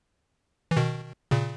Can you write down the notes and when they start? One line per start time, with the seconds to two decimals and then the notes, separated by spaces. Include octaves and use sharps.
0.71 E3
0.77 B2 D#3
1.31 A#2 C#3